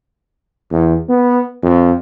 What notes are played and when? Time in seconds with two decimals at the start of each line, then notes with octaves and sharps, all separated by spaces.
0.72 E2
1.09 B3
1.63 F2